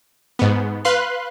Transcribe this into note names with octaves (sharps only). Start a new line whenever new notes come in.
G#2 B3
B4 F5 C6 F#6